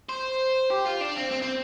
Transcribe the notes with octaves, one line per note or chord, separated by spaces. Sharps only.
C5
G4
F4
D4
C4
C4
C4